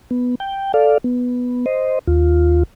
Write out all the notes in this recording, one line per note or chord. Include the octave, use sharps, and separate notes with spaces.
B3
G5
A4 D5 F5
B3
C5 D#5
D#2 F4